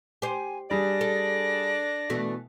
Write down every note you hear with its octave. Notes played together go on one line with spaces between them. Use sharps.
G4 C5 G#5
G3 D4 G#4 D5 A#6
A4
B2 E3 A3